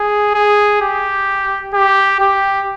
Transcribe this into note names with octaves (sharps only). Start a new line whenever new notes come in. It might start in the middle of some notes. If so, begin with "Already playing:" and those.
Already playing: G#4
G#4
G4
G4
G4